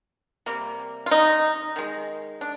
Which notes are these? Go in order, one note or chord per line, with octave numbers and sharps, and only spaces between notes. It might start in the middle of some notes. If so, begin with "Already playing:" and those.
C3 G3 A#3
F4
D#4
D#3 G#3
D4